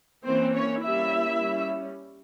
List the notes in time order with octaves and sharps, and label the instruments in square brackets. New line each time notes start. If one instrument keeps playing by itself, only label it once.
[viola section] E3 A#3 C4 C#4 C5
C#4 C#5
G3 A#3 C#4 E4 E5
G3 C#4